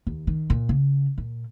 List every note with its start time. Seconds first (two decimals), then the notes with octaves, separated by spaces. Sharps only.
0.07 D#2
0.27 D#3
0.50 A#2
0.69 C#3
1.18 A#2